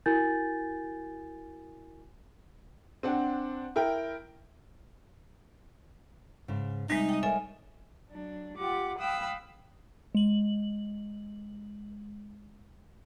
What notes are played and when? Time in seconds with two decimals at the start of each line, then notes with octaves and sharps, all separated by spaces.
0.06 E4 F#4 A#4 G#5 G6 A6
3.03 C4 D4 F#5
3.76 E4 A#4 G5
6.48 G#2 C#3
6.90 C3 G3 G#3 D#4
7.09 D#5 G5
7.23 A4 A#4 C#5 E5 G#5
8.09 F#3 D4
8.58 F4 G4 F#5 D6
8.99 F5 G5 B5 D#6 E6 F#6
10.15 G#3 F#7